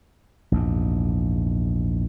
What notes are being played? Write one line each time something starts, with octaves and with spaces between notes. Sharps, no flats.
A#1 E2 G#2